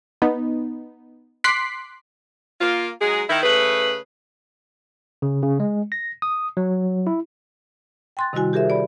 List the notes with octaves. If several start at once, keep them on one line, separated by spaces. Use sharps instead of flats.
B3 D#4
C6 D6 F#6 B6 C7
A#3 F4
F#3 G#3 D#4 G#4
D#3 E4
C#3 A3 G#4 B4
C#3
C#3
G#3
A#6
D#6
F#3
E4
G5 G#5 C6 F#6 A6
C3 D#3 G3 E4 F#4 G#5
G4 G#4 A#4 C5 E5
D5 B5